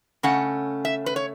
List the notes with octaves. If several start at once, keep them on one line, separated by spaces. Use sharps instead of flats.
C#3 A3 C#4 F#5
E5
B4
C#5